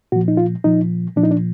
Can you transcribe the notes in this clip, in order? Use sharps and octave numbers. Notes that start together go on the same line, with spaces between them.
A#2 F3 F#4
D#4
F4
A#2 F3 D#4
A#2 F3 D4
D#4
D4